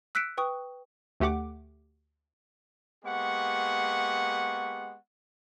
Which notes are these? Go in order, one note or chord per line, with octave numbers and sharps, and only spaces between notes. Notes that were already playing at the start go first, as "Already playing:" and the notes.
E6 F#6 B6 C#7 D7 E7
B4 G5 C#6 D#6
D2 A3 G4 F#5 D6
G#3 A#3 B3 G4 F#5 C#6